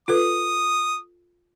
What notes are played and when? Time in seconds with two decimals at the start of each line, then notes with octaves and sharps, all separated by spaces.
0.08 F4 A4 B4 D#6